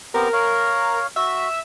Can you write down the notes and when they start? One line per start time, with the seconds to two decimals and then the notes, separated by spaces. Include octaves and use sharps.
0.14 B3 C4 G4 A#4
0.33 C#5 F5
1.16 F#4 E5